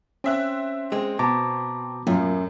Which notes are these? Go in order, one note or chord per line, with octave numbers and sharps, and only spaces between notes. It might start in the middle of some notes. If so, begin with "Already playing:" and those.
C4 C#4 E5 F#6
G#3 C4
B2 A5 A#5 D6
F#2 A2 A#3 F4